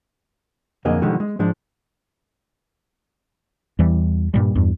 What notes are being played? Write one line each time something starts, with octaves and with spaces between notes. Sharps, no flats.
B1 F2 D3 A#3 G#4 D#5
B2 D3 D#3 F3 G3 G#3
G#3
G#2 F3 G#3 D4
E2 E3 G3
G2 A#2 G3
E2 G2